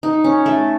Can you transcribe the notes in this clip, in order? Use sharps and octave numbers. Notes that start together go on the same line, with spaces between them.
D#4
C#4
A3